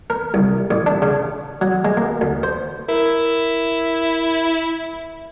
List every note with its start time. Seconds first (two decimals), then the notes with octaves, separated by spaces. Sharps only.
0.10 A#4
0.34 C2
0.71 A1
0.86 D4
1.02 C#3
1.61 F#3
1.85 G#3
1.97 A#3
2.21 D2
2.43 C5
2.89 E4 A#4